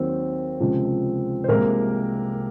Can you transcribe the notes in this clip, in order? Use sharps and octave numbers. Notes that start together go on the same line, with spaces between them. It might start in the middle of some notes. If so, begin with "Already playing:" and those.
Already playing: D#2 D#3 F#3 C4 C5
C#2 C3 F3 G#3
C5
C2 C3 F3 G#3 A#3 A#4